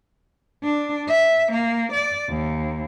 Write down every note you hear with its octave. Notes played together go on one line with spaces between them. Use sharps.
D4
E5
A#3
D5
D#2